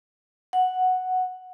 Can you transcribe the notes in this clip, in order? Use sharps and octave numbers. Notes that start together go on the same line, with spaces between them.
F#5